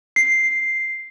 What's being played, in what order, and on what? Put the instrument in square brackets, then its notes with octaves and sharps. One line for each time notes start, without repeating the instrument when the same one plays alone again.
[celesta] C7